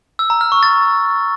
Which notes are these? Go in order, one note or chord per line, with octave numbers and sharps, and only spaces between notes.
E6
A#5
F6
C#6
A6